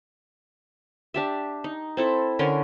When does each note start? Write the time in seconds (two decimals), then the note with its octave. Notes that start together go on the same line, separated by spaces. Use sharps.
1.14 D4 G4 E5
1.64 D#4
1.97 C4 E4 A4
2.39 D3 C#4 A#4 C6